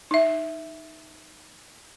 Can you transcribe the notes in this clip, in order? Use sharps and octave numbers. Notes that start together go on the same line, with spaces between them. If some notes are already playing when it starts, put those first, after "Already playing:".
D#4 E5